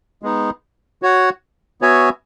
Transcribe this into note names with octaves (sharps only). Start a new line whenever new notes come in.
G#3 B3 D#4
F#4 C#5 F#5
B3 F#4 C#5 E5 G#5